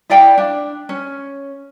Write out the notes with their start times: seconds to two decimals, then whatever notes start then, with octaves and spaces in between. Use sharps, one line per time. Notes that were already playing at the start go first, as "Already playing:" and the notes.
0.10 E4 D5 F5 G5
0.38 D4
0.89 C#4